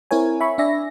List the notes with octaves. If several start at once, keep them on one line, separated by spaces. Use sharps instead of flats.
C4 E4 A#4 C#5 G#5
E5 B5 C#6
D4 D5 E5 G#5 A#6